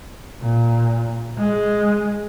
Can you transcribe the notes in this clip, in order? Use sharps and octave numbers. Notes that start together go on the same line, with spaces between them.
A#2
G#3